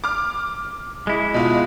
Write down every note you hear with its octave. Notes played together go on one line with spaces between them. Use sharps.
D6 F6
G#3 E4
B2 F4